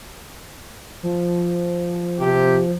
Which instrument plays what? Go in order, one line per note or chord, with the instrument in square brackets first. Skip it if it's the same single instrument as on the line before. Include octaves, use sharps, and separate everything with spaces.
[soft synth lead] F3
[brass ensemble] C3 G4